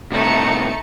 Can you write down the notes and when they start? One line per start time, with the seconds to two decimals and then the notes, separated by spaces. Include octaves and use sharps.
0.12 A2 C3 A3 D#4 C#7